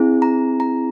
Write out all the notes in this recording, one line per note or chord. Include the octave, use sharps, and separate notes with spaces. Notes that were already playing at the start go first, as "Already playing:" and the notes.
Already playing: C4 E4 G#4
A#5
A#5